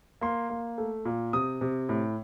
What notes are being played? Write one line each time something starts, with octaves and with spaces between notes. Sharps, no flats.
A#3 C6
A#3
A3
A#2
C3 D#6
C3
A2